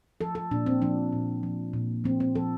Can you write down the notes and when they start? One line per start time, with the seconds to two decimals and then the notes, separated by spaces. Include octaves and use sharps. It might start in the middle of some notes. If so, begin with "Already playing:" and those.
0.21 F3 A4
0.35 A4
0.51 A#2 D4
0.66 C4
0.82 F3 D4
1.13 A#2
1.43 F3
1.73 A#2
2.04 F3 C4
2.20 C4
2.35 F3 A4